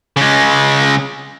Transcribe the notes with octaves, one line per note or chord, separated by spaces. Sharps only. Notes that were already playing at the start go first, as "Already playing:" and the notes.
C#3 G#3